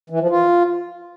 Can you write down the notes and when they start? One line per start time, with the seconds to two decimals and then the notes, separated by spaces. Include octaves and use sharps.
0.10 E3
0.20 F3
0.30 F4